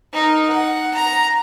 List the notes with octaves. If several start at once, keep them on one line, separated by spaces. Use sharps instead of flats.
D#4 A#4
F#5
A#5